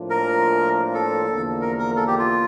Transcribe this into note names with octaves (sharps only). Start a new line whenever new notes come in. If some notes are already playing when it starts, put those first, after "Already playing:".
Already playing: A2 F3 A#3 D4 F4
A#4
A4
E2 D3 F3 A#3
A#4
A#4
A4
G4
F4